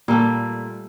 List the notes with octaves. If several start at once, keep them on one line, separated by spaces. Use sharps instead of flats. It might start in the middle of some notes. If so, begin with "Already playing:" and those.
A#2 G3 A3